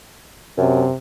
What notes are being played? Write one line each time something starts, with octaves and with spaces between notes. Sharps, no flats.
F#2 C3